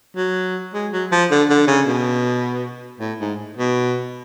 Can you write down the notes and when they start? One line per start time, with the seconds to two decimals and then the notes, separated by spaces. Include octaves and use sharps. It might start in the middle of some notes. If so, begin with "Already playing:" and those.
0.16 F#3
0.74 G#3
0.92 F#3
1.12 F3
1.30 D3
1.49 D3
1.67 C#3
1.87 B2
3.00 A2
3.20 G#2
3.57 B2